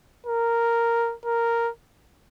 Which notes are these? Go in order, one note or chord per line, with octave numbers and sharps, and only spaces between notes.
A#4
A#4